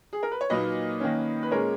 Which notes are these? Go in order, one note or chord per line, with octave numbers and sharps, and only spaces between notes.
G#4
A#4
B4
C#5
A#2 F#3 A#3 D#4 B4 D#5
D#3 A#3 C#4
B4
A#2 G#3 C#4 A#4 C#5